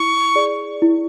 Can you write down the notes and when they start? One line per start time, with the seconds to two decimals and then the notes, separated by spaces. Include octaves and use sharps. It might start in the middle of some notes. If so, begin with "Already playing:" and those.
Already playing: E4 C#6
0.35 G#4 D5
0.82 E4